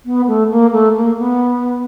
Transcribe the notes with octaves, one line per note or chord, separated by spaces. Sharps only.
B3
A3
A#3
A3
A#3
B3